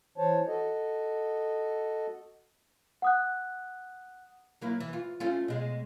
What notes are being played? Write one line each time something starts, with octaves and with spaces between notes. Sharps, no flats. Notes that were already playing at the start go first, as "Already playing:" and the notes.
E3 C5 C#5 A5
F#4 A4 D#5
F#5 D#6 F#6
F#3 A#3 E4
E3
F4
A3 C#4 F4
B2 G#3